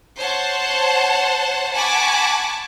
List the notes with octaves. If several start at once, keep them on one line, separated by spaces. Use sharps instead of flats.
C5 C#5 F#5 A5
F#5 G#5 A5 B5 C#6 D6